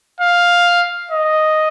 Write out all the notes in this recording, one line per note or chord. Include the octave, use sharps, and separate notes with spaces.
F5
D#5